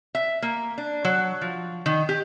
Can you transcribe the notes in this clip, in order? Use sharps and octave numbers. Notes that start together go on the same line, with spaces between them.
E5
A#3
D4
F#3
F3
D#3
G4